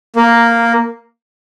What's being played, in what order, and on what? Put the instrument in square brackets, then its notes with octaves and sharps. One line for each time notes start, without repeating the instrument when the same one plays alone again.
[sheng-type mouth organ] A#3